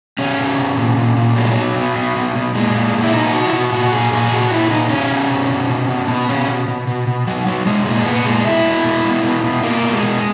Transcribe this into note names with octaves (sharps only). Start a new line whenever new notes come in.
B2 C#4
B2
B2
A#2
A#2
A#2
B2 F#3
G#3
B2 F#3
B2
B2
B2
B2
A#2 G#3
A#2
A#2
E4
B2 D#4
B2 F#4
E4
B2 F#4
A#2 F#4
A#2 G#4
A#2 G#4
A#2 F#4
A#2 E4
A#2 D#4
B2 C#4
B2
B2
B2
B2
B2
B2 B3
B2 C#4
B2
B2
B2
B2
B2 F#3
B2 F#3
B2 G#3
A#2 G#3
A#2 B3
A#2 G#3
B2 E4
B2
B2
B2
B2
B2
B2 A#3
B2
G#3
B2